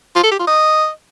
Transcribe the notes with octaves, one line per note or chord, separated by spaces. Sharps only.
F4
A4
G4
F4
D#5